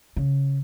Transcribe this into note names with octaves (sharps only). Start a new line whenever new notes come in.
C#3